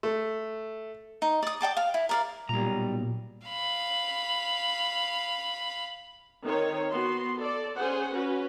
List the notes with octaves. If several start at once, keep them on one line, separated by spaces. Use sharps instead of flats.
A3
D#4
D5 D#6
D5 G5 A5 D6
F5
E4
A#4 D5 F5
B1 A#2 G3 A#5
F5 B5
D#3 C4 C#5
B3 F#4 C6
A4 D5
C#4 G#4 C5 F#5
C#4 F#4 B4